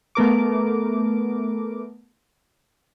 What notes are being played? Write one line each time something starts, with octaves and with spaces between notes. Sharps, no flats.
A3 B3 A#4 D6